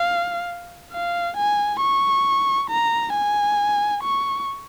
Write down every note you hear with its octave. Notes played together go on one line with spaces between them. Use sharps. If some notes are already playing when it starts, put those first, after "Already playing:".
Already playing: F5
F5
G#5
C#6
A#5
G#5
C#6